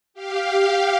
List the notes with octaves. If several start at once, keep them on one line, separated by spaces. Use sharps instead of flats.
G4 F5